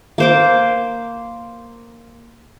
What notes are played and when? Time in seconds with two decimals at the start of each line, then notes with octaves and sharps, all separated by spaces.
0.18 A#3 C5 D6